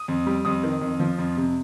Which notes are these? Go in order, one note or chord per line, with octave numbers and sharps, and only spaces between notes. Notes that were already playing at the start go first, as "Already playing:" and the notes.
Already playing: D#6
F2
G3
F2 D#6
D#3
F2
F3
F2
C3